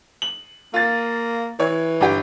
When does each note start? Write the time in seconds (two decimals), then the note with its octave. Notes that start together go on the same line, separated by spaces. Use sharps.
0.22 F#7
0.74 A#3 F4 A6
1.60 E3 C#5
2.00 G1 G4 G5